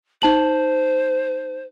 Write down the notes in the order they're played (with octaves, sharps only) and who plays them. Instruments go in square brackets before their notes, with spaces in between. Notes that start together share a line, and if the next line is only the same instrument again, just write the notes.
[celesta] D#4 A5 F#7 [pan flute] C5